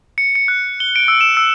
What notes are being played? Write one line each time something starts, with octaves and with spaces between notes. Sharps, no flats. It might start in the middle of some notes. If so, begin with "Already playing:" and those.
C#7
C#7
F#6
G7
D7
E6
E7
E6